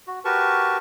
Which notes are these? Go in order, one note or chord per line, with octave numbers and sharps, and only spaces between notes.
F#4
F#4 G4 A#4 B4 A5 C#6